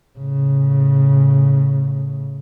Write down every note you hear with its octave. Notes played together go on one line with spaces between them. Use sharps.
A2 C#3